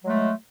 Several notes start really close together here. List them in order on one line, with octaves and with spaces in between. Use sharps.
F#3 G#3 A3